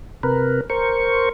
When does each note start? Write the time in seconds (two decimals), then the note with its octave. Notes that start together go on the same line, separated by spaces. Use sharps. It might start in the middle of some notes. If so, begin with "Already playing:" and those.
0.23 C3 A#4 B4
0.70 A#4 C5 C#6